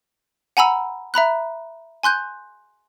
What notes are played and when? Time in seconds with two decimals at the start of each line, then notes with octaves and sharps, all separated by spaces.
0.57 F#5 G#5 A#5 B5 E6
1.14 E5 A#5 B5 F#6
2.03 G#5 C6 F#6 G6